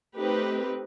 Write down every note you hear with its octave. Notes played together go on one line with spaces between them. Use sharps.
A3 C4 D#4 G4 B4